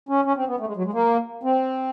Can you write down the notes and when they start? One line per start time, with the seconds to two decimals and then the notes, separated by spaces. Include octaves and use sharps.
0.09 C#4
0.25 C#4
0.37 C4
0.48 B3
0.60 A3
0.67 G#3
0.77 F#3
0.85 G#3
0.94 A#3
1.43 C4